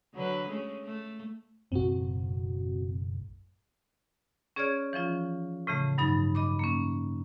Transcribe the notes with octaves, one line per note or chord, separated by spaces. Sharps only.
D3 F#3 B4
G#3 A3 C#4
A3
F#1 B1 A2 C4 F#4
C#4 G#4 C#5 D5 F6 G#6
E3 F3 C#4 F4
A2 C#3 E3 A3
G2 F#3 D#4 B5 A6
D#5 B5 D6
A#3 C#4